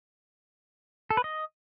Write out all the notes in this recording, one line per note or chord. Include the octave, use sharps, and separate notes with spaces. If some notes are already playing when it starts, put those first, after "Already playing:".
A4
B4
D#5